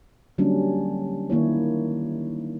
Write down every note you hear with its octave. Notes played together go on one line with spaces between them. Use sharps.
D3 F#3 G3 A#3 C#4 D4
D#3 A#3 E4 C#5